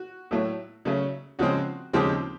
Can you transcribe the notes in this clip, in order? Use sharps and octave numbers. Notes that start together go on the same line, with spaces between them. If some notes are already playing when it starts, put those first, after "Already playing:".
Already playing: F#4
A2 F#3 A3
C#3 F#3 A3 C#4
C#3 F3 G#3 C4 F#4
D#2 C#3 F3 G#3 C4 G4